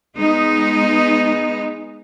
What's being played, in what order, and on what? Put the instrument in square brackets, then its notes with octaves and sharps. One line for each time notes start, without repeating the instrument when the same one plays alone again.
[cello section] G#3 B3 D#4